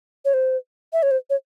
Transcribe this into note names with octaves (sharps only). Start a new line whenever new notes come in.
C#5
C5
E5
C#5
C5
C#5